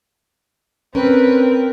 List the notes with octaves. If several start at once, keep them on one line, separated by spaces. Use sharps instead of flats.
C4 C#4 A#4 B4